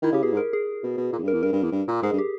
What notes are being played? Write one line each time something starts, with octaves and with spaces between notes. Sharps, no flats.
D#3 E4
C#3 G4
B2 G#4
G#2
A#4
G#4
B2
B2
A#2
E2
G2
A#4
E2
G2 A#4
G2
E2
G2
A#2
G#2 G#4
G2
G4